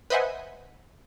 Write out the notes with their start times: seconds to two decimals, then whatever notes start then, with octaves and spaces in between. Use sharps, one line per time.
0.10 B4 C5 D#5 E5 F#5 G#5